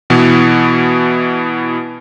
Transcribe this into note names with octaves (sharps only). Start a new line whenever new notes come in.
B2 E3 B3